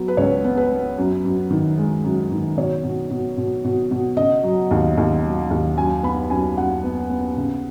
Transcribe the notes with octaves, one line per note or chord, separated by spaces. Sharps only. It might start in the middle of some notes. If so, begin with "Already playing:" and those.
Already playing: F#3 B3
B4
C#2 C#5
B3
B4
B3
F#2
F#2
D#3
G#3
F#2
D#3
B2 C#5
B2
B2
B2
B2
B2
C#3 D#5
F#3
D#2
D#2
F#3
D#2
F#2 G#5
B3 B5
F#2 G#5
F#2 F#5
B3
B3
C#3